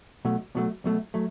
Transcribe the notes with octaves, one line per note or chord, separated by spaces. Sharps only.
B1 B2 F#3 A3
B1 B2 F#3 A3
B1 B2 F#3 A3
F#3 A3